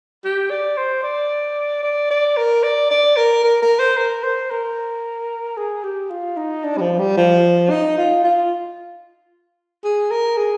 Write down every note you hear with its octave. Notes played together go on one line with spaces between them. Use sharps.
G4
D5
C5
D5
D5
D5
A#4
D5
D5
A#4
A#4
A#4
C5
A#4
C5
A#4
G#4
G4
F4
D#4
D4
G3
F3
G3
F3
D#4
F4
F4
G#4
A#4
G#4